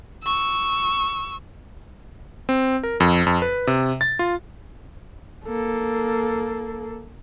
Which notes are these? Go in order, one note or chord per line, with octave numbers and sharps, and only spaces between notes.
C#6 E6
C4
A#4
F2
F2
B4
C3
A6
F4
A#3 A4